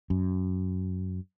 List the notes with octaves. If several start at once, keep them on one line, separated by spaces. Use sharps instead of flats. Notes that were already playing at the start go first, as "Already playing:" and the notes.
F#2